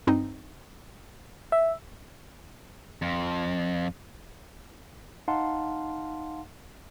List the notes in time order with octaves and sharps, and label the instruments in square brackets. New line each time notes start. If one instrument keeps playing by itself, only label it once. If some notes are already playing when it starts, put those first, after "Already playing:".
[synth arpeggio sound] G2 C4 D#4
[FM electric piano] E5
[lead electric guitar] F2
[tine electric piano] D#4 F5 F#5 A5 C6